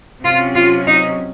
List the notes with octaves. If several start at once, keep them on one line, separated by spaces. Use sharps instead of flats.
C3 F#3 C#4 F4
F4
D#4